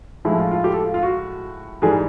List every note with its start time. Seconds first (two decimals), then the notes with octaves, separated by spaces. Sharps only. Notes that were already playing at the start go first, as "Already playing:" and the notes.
0.25 A2 F3 G#3 E4
0.38 F4
0.51 F4
0.64 G4
0.74 A4
0.84 F4
0.94 F4
1.03 F#4
1.82 G#2 E3 G3 G#4